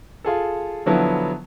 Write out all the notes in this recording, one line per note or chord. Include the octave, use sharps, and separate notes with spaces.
F4 G#4 A4
D3 F3 F#3 B3 E4